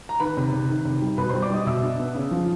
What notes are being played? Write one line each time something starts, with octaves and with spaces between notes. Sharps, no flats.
A#5
D#3 B4 B5
C3
C3
D#3
C3
G3
B2 B4 B5
G3 C5 C6
D5 D6
G3 D#5 D#6
B2 E5 E6
D4
B3
C#3
F3